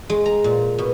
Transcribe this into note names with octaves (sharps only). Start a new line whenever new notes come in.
G#3
A#5
A#2
B2